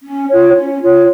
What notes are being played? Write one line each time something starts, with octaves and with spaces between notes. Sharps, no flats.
C#4
F4 C#5
C#4
F4 C#5